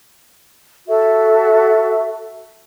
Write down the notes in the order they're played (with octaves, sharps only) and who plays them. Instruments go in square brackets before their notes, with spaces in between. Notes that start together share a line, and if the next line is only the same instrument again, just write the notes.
[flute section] F#4 A4 E5